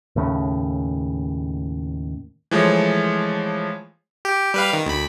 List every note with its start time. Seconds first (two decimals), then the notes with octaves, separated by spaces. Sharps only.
0.16 D#2 A2 C#3
2.51 E3 F3 G#3 A3 C#5
4.25 G4
4.54 G3 B4 F5
4.73 D#3
4.86 D2 B5